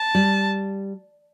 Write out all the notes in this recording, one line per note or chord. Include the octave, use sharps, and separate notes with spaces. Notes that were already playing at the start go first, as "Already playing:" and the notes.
Already playing: A5
G3